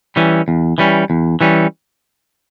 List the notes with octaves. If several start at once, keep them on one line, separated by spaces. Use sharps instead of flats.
E3 G3 C#4
E2
E3 G3 C#4
E2
E3 G3 C#4